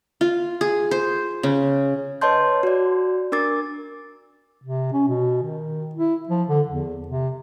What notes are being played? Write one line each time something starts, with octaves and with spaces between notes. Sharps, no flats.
F4
G#4
C5
C#3
B4 C#5 D#5 A5 C6 G6
F#4 D5
D4 A#4 D6 A6
C3
C#4
B2
D#3
E4
F3
D3
E2
C3